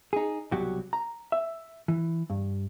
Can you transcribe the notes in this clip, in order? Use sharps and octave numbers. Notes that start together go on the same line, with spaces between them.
D#4 G#4
C2 B2 F#3 F#4 G4
A#5
E5
E3
G2